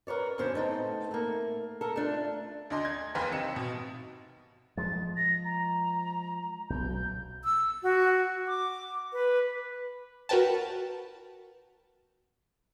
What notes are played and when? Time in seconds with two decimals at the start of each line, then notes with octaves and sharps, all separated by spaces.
0.07 A#4 B4 C#5 D5
0.38 F#2 A2 D3 C#4 C5
0.55 A3 B3 C4 D#4 A4
1.11 A3 A#3
1.81 A4 A#4
1.96 A3 D4 F4
2.70 D2 D4 D#5 C6
2.85 G#6
3.15 F1 D#2 B4 F5 G5 C6
3.32 C3 D#4 C#7 E7
3.56 B2
4.77 F3 G#3 A6
5.17 A#6
5.45 A#5
6.70 B1 B2 G6
7.45 E6
7.83 F#4
8.47 D6
9.13 B4
10.29 F#4 A#4 B4 G5 A5